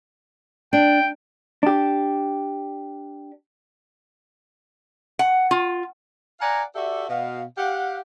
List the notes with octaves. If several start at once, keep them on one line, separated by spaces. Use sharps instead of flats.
D4 G5
D4 G4
F#5
F4
D5 F5 F#5 G#5 A#5
F#4 G4 A4 D5 E5
B2 F5
G4 F5 F#5